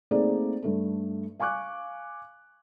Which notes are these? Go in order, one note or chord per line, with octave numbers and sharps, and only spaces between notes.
A3 A#3 C4 D#4 G#4 D5
G2 A3 A4
F5 G#5 C#6 D6 F#6